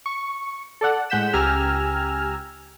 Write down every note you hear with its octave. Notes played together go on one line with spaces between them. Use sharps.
C#6
A4 D5 F#5
A2 G#3 F#5 G6 B6 E7
C#2 G4 G#5 A#5 E6 F6